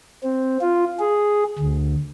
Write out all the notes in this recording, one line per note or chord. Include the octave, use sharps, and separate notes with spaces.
C4
F4
G#4
D2